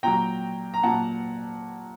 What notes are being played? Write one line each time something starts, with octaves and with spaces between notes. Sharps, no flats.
A#2 F#3 G5 A#5
A#5
A#2 F#3 F#5 A5